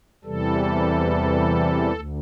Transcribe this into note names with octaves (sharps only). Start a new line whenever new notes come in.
E2 C3 E3 G3 A4
D2